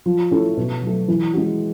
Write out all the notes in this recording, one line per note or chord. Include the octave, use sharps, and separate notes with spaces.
F3
A3 C#4 E4
B2
F#3 A3
E3
G#3 C#4 F#4